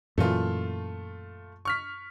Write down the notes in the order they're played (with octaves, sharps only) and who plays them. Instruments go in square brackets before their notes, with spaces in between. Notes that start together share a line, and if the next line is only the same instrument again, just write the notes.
[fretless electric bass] F#2 A#2 E3 [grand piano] A3 F4
[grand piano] C#6 F6 B6